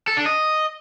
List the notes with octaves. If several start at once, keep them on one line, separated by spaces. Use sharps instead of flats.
A4
D4
D#5